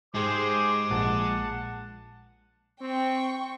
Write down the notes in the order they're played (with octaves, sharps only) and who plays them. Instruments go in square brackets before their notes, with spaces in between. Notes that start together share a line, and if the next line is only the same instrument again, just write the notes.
[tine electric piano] G#2 G4 [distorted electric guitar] G#3 [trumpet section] G#4 C5 [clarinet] D6
[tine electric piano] A#1 A#2 [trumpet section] F#5 A5
[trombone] C4 [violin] G5 C#6